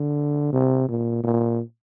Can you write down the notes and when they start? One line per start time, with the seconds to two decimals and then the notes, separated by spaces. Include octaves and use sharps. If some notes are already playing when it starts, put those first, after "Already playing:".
Already playing: D3
0.52 C3
0.88 A#2
1.23 A#2